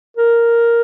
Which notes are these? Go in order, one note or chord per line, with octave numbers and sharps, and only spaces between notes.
A#4